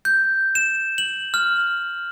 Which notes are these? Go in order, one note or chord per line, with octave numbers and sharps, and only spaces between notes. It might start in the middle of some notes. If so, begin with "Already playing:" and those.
G6
E7
F#7
F6